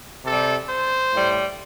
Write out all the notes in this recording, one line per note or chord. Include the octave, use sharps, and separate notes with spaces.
C3 G3 A4
C5
A2 G3